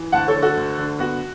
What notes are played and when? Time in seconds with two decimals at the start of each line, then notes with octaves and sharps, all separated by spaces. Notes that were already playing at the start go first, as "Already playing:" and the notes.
Already playing: E3
0.12 D2 F#5 A5
0.27 A4 C#5
0.34 D3
0.42 F#4 A4
0.56 D2
0.78 D3
0.99 B3 F#4